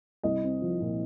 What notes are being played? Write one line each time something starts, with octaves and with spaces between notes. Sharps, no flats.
C2 D#5
C4
F3
A#2